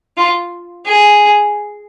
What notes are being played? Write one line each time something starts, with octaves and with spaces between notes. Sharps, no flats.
F4
G#4